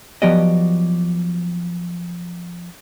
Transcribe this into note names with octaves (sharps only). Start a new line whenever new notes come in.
F3 F#3 B3 G4 D5 D#5